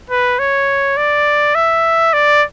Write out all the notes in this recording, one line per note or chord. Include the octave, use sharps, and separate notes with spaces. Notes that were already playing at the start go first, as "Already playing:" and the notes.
B4
C#5
D5
E5
D5